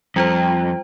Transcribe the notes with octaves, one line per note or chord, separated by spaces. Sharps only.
F2 G3 F4 C5 G5